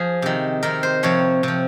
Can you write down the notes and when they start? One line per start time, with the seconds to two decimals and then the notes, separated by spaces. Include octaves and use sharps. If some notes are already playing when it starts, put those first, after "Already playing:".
Already playing: F3 G#4
0.22 C3 D#3
0.63 C3 D#3 A#4
0.83 C5
1.03 C3 F3 C#5
1.43 C3 F3